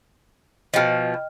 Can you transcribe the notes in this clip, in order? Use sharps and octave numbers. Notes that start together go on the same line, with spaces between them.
B2 F3 D#5 G5 F6